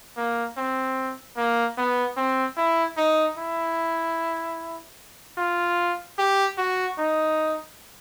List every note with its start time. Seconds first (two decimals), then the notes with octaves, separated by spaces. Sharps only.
0.17 A#3
0.57 C4
1.37 A#3
1.78 B3
2.17 C4
2.57 E4
2.97 D#4
3.38 E4
5.37 F4
6.18 G4
6.58 F#4
6.98 D#4